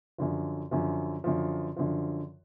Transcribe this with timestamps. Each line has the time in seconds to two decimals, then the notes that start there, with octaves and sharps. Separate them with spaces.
0.18 F#2 D3 F3
0.71 F#2 D3 F3
1.24 F#2 D3 F3
1.77 F#2 D3 F3